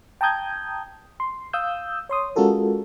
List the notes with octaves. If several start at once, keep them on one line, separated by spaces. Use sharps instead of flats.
G5 A5 A#5 D#6 G6 G#6
C6
F5 D#6 E6 G6
C#5 C6 D#6
G#3 C#4 F4 F#4 A4 A#4